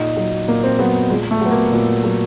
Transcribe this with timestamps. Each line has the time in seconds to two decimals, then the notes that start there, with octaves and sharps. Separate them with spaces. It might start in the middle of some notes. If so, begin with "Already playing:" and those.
Already playing: A#2 D#4
0.17 F#3
0.48 A#2 A#3
0.64 C4
0.79 F#3 B3
1.10 A#2 G#3
1.31 A3
1.41 F#3 B3
1.51 A#3
1.72 A#2
2.04 F#3